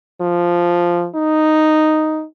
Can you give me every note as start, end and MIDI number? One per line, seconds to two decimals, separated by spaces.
0.22 1.07 53
1.15 2.24 63